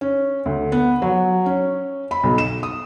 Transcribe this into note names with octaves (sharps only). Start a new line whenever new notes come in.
C#4
D2
B3
F#3
C#4
B5
B1
E7
D#6